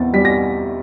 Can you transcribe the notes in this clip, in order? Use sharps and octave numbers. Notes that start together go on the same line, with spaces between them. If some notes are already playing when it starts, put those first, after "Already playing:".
Already playing: E2 C4 A6
G3 B6
A#6